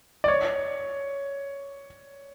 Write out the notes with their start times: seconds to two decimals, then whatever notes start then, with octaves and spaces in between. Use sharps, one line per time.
0.24 D5
0.28 C#5